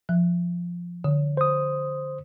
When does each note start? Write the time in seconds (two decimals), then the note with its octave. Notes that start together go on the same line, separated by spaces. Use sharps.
0.09 F3
1.04 D3
1.37 C5 D#6